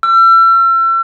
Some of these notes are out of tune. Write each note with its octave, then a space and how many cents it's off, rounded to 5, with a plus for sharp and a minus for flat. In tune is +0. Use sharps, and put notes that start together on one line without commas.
E6 +40